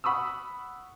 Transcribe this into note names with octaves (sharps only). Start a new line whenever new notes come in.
F#5 B5 C#6 D#6 E6